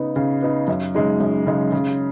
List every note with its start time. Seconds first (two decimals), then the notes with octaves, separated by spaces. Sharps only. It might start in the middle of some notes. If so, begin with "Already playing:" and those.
Already playing: C#3 B3 D#4
0.16 C#3
0.42 B3 D#4
0.68 F#2
0.95 C#3 G#3 D#4
1.20 F#2
1.46 C#3 G#3 D#4
1.72 C#3